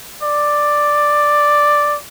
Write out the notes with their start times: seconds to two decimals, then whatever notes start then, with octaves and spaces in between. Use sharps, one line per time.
0.23 D5